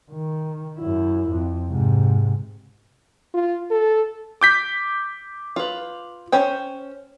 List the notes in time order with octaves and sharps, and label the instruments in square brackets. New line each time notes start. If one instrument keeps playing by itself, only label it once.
[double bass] D#3
F#2 E4
F2
G#2 C3
[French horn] F4
A4
[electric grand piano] D6 G6 B6
[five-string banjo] F4 B4
C#4 C5 G5